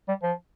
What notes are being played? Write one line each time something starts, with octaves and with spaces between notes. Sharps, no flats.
G3
F3